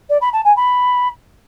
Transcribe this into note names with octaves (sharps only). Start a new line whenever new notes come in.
D5
B5
A5
G#5
B5